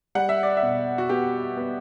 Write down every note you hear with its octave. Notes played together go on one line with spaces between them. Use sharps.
G3 F#5
E5
D5
E5
B2
F#4
B3 G4
B3